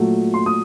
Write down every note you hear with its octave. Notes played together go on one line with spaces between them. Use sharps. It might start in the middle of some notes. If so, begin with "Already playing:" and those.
Already playing: A#2 F#3 A3
C6
D#6